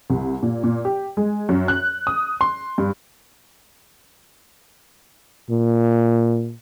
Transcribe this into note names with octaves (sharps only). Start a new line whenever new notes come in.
C2
A#2
A#2
G4
G#3
F#2
F#6
D#6
C6
G2
A#2